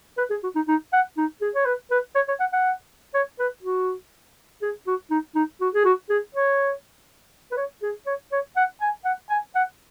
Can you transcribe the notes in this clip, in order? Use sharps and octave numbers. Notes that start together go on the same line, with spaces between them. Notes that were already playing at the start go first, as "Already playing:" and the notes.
B4
G#4
F#4
D#4
D#4
F#5
D#4
G#4
C#5
B4
B4
C#5
C#5
F#5
F#5
C#5
B4
F#4
G#4
F#4
D#4
D#4
F#4
G#4
F#4
G#4
C#5
B4
C#5
G#4
C#5
C#5
F#5
G#5
F#5
G#5
F#5